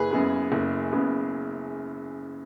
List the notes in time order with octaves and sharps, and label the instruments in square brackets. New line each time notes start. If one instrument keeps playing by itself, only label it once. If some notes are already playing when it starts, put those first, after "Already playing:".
Already playing: [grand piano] F#1 G#4 B4
F#2 C#3 B3
F#1
F#2 C#3 B3